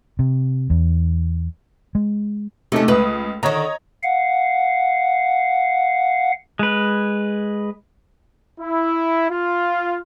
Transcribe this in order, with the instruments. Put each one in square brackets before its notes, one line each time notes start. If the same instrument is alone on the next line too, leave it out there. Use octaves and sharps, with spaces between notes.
[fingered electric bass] C3
E2
G#3
[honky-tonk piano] C3 D#4 A4 [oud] A3 C#4
[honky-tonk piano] C#2 D#6 [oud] B4
[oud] D3 D#3 [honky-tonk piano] C#5 D#5 A#5
[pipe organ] F5 F#5
[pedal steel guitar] G#3 B4
[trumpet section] E4
F4